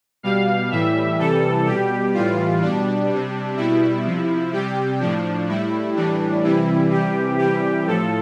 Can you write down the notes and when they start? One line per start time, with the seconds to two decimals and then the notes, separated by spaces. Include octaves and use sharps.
0.23 B2 G3 F5
0.71 A2 E3 G3 E5
1.19 C3 E3 G3 A4
1.66 B2 G3 G4
2.14 A2 E3 G3 F4
2.62 B2 G3 D4
3.09 C3 G3
3.57 B2 G3 E4
4.05 C3 F3
4.53 C3 G3 G4
5.00 A2 F3 D4
5.48 A2 G3 E4
5.96 A2 E3 G3 D4
6.43 C3 E3 G3 E4
6.91 C3 E3 G3 G4
7.39 C3 E3 G3 G4
7.87 A2 F3 A4